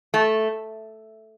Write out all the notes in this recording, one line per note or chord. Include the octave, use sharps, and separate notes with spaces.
A3